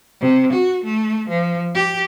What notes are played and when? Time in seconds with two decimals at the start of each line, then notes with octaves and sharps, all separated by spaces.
0.21 C3
0.53 F#4
0.84 A3
1.29 F3
1.75 G4